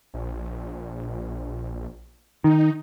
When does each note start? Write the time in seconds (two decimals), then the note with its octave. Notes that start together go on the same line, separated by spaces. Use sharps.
0.14 A#1
2.44 D#3 D#4